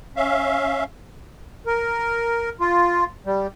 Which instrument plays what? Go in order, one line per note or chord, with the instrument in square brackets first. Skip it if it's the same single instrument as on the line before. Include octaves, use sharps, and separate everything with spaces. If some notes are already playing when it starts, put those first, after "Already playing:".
[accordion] C#4 E5 F5
A#4
F4
G3